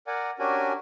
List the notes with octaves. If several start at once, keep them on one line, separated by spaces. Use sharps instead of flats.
A#4 D5 F#5 G#5
C#4 D4 F#4 G4 A#4 G#5